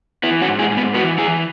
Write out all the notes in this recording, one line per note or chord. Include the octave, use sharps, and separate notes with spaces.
E3 B3 E4
C#4 F#4
G#2
E4 G#4
G#2
B3
E3 F#4 B4
E3 E4 G#4